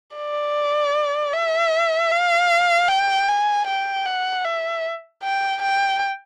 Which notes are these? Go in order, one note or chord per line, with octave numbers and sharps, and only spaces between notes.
D5
E5
F5
G5
G#5
G5
F#5
E5
G5
G5